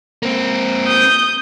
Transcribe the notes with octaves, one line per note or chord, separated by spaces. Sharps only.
A#3 C4
D#6 G6